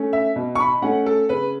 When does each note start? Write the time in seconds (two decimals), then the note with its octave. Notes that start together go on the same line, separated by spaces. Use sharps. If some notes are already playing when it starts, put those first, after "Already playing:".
Already playing: A3 C#4
0.13 E5
0.36 B2
0.55 C#6
0.60 B5
0.82 A3 C#4 F#5
1.06 A4
1.29 C#3 B4